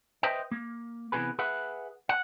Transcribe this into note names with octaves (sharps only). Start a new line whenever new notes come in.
B4 C5 D#5 E5 G5
A#3
C3 E3 G#3 B3 G#4 B4
G#4 B4 E5 F#5
F#5